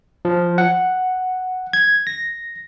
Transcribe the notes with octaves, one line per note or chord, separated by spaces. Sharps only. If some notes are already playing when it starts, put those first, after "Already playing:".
F3
F#5
G#6
A#6